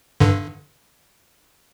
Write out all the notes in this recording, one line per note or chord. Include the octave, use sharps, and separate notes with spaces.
G2 D3